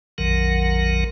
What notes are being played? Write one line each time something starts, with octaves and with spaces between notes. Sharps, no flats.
A#1 F2 D#3 F#3 A#4 F#5